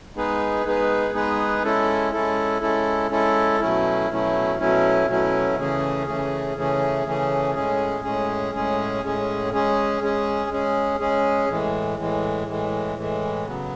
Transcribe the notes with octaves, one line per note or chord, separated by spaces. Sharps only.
G#3 B3 D#4 G#4 B4
G#3 B3 D#4 G#4 B4
G#3 B3 D#4 G#4 B4
G#3 C#4 E4 A4
G#3 C#4 E4 A4
G#3 C#4 E4 A4
G#3 C#4 E4 A4
B2 F#3 A3 C#4 E4
B2 F#3 A3 C#4 E4
B2 F#3 A3 C#4 E4
B2 F#3 A3 C#4 E4
C#3 E3 A3 C#4 G#4
C#3 E3 A3 C#4 G#4
C#3 E3 A3 C#4 G#4
C#3 E3 A3 C#4 G#4
A2 G#3 C#4 G#4
A2 G#3 C#4 G#4
A2 G#3 C#4 G#4
A2 G#3 C#4 G#4
G#3 C#4 G#4
G#3 C#4 G#4
G#3 C#4 G#4
G#3 C#4 G#4
A2 E3 G#3
A2 E3 G#3
A2 E3 G#3
A2 E3 G#3
C#3 F#3 B3